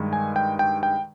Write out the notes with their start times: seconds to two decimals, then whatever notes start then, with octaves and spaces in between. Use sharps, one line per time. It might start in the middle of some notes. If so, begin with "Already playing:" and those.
Already playing: G2 D#3 G#3
0.13 G#5
0.36 G5
0.59 G5
0.83 G5